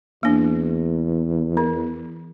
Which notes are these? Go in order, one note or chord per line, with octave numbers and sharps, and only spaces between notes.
E2 A#3 D4
E3